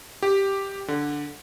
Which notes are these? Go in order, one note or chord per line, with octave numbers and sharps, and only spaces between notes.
G4
D3